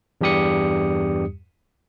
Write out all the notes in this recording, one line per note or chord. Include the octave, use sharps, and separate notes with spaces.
E2 G2 G3 G4 D#6 C#7